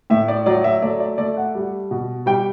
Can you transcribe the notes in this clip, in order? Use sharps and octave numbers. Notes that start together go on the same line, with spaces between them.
A2 E5
D5
F#3 D5
E5
A3 D5
D5
A3 D5
F#5
G3
B2
G3 G5